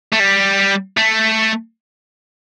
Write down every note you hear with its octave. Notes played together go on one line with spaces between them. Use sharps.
A3
G3
A3